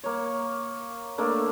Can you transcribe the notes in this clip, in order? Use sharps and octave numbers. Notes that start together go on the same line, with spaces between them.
A#3 C#5
A3 A#3 D4